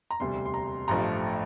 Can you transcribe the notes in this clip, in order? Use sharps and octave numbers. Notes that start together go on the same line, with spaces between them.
A#5
E1 D2 C3 G3 C6
C6
A#5
A1 G2 F3 A3 A#5